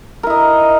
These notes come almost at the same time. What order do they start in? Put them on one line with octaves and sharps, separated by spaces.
A#4 E4 D#5